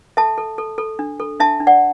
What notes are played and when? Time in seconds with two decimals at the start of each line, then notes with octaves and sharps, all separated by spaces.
0.17 A4 E5 A5
0.38 A4
0.58 A4
0.78 A4
0.99 D4
1.20 A4
1.40 D4 E5 A5
1.60 D4
1.67 D5 F#5